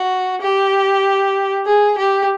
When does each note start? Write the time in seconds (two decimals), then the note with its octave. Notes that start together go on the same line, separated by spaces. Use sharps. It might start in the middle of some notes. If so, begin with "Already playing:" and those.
Already playing: F#4
0.41 G4
1.66 G#4
1.98 G4